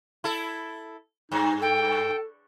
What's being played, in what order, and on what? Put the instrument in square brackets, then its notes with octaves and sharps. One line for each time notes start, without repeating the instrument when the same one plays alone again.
[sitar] E4 A4
[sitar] G2 [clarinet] D#4
[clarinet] A4 [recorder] G5